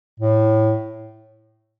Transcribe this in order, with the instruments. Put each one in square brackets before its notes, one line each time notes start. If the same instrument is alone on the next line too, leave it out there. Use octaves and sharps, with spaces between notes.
[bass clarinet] A2